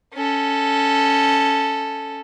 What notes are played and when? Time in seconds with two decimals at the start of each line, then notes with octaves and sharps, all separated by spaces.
0.14 C#4 A4